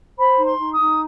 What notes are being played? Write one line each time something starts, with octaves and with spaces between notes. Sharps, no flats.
C5 B5
D#4
C6
D#4
D#6
D#4